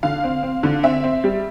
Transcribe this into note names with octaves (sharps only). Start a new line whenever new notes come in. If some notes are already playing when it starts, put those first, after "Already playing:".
D3 F5
C4
C4
D3
C4 E5
C4
G3